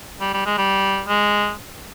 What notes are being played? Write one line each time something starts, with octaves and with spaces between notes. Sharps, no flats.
G3
G3
G#3
G3
G#3